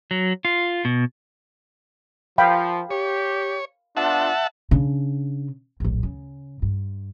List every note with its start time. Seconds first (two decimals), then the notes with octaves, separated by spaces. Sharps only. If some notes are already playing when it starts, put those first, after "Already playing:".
0.11 F#3
0.45 F4
0.85 B2
2.38 F3 F5 G5 B5
2.91 G4 C#5
3.97 B3 D4 F4 E5 F#5 A5
4.71 C#3 D4
5.80 D1 A#1
6.03 C#3
6.62 G2